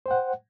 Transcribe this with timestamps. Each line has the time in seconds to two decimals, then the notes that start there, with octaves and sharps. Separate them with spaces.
0.06 C5
0.08 G5
0.11 F#5